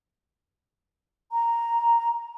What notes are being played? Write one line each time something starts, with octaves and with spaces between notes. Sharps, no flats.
A#5